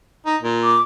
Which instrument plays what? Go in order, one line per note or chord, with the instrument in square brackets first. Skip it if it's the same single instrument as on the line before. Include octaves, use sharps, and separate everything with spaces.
[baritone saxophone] D#4
A#2
[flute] D6